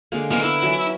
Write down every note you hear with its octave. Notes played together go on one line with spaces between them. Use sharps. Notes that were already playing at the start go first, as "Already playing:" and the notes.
D3 G#3 A#3
G#3 A#3 B3 A#4 F5
E4
E3 F#3